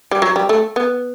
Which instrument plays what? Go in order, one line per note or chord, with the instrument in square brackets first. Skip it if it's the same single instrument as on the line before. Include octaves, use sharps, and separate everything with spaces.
[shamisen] G3
F#3
G3
A3
B3